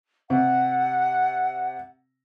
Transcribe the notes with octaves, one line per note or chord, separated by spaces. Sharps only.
C3 F#5